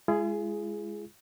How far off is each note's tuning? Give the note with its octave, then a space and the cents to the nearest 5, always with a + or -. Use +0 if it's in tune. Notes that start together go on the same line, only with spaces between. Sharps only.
G#3 +0 F4 -45 G#4 +5